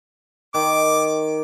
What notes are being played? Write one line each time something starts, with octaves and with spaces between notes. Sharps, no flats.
D#3 D6